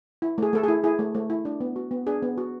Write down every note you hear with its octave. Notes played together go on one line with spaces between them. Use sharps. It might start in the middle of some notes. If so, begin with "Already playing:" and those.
E4
A3 G#4
A3 A4
E4 G#4
E4 G#4
A3
A3
E4
D4
B3
F#4
B3
D4 G#4
B3
F#4